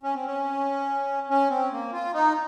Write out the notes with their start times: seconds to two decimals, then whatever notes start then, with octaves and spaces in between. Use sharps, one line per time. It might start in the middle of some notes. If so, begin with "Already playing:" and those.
0.03 C#4
0.14 C4
0.26 C#4
1.30 C#4
1.50 C4
1.72 A#3
1.93 F4
2.14 D#4